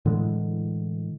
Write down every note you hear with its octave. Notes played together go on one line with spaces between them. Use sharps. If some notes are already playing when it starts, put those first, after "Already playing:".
A2 D3 E3 G#3